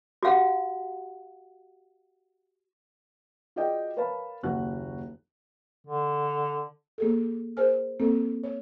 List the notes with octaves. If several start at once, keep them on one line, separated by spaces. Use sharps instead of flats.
F#4 G4 F5 F#5
F4 F#4 G#4 D5 D#5 G5
A#4 B4 C#5 F5 A5 B5
F#1 D#2 F#4 F#6
D3
A#3 G#4 A4
G#4 A#4 C5 G#5 F6
A#3 C4 A4
C#5